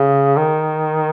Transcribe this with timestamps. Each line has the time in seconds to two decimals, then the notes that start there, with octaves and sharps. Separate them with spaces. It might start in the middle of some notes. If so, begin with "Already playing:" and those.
Already playing: C#3
0.37 D#3